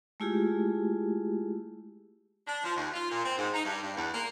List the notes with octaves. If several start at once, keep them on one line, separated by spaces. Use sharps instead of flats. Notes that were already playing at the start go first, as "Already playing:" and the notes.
G#3 A3 E4 F4 G4 G#4
D4
F3
D#2
F4
A#2
C4
G#2
D#4
G2
G2
E2
A#3